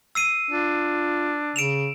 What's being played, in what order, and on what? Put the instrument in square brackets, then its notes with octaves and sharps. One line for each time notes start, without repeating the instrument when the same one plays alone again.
[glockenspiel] E6 C7 D#7
[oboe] D4 [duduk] F4
[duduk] C#3 [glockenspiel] D7 E7 F7